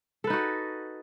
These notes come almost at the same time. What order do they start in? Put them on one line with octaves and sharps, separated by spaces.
A4 B4 D#4 F#4